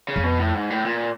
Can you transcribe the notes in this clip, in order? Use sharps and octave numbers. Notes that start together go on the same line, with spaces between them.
C#3
F2
B2
A2
G#2
A2
A#2